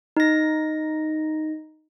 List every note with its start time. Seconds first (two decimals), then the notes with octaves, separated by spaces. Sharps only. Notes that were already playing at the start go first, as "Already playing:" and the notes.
0.17 D#4 A#6